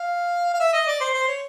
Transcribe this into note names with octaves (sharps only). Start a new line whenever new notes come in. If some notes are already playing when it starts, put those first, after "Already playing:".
Already playing: F5
F5
E5
D#5
D5
C5
C5
C#5